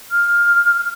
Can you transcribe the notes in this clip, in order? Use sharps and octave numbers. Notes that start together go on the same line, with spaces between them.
F6